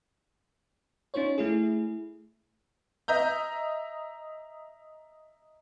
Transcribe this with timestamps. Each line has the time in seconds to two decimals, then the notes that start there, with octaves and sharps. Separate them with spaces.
1.14 C#4 D#4 F4 C5 C#5
1.38 A3 E4 G#4
3.08 D#5 E5 A#5 G6